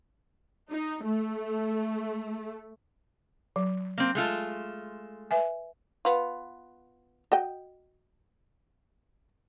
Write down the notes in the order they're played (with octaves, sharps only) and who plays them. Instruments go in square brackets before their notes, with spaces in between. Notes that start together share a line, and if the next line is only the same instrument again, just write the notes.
[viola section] D#4
A3
[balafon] F#3
[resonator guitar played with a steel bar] A#3 C4
G#3 A3 F4
[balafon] B4 E5 G#5
[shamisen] B3 F4
F#4 D#5 G5